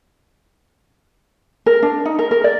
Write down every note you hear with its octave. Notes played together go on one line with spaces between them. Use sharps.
A#4
D4
D#4
A#4
A#4
D5